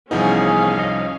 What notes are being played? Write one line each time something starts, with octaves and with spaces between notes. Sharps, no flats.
C2 E3 F3 B3 C#4 D#4 G#4 F5
D#5